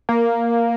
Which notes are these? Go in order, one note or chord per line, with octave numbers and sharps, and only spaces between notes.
A#3